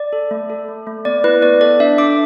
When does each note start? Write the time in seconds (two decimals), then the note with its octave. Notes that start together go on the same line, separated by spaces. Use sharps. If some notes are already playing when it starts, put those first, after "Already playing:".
Already playing: D5
0.13 A4
0.31 A3
0.50 A4
0.69 A3
0.87 A3
1.05 B3 D5
1.24 E4 B4
1.42 B3 D5
1.61 A4 D5
1.80 D4 E5
1.98 D4 D6